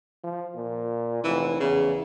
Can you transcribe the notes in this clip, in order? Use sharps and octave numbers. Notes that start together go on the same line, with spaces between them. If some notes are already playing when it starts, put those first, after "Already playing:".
F3
A#2
F1 E3
E2 C#3